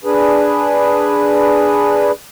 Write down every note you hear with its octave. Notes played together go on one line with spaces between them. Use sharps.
D4 G#4 B4